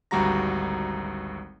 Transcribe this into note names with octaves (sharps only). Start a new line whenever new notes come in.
G#1 D2 G3 F#4 A#5 A#6